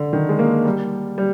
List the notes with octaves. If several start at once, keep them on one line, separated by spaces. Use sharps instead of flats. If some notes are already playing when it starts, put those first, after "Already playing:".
Already playing: D3
D#3
G#3
A#3
G3
G3